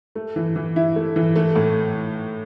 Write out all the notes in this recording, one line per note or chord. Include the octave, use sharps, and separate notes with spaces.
A3
E3
E3
E4
A3
E3
A3
A2